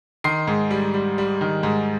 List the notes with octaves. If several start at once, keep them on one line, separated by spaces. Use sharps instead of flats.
D#3 C6 C7
G#2
G3
G3
G3
D#3
G#2